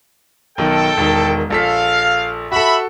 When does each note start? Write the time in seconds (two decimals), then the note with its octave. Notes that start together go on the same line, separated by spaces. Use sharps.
0.58 B1 D#3 A4 G5
0.97 E1 D#3
1.50 A#1 A4 F5 B6
2.52 F#4 A4 E5 B5